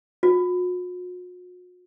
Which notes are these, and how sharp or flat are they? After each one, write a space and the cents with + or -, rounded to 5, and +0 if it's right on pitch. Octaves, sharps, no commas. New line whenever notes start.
F#4 -45